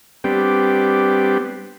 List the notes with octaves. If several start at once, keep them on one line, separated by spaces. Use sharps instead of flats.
G3 B3 C4 D4 G4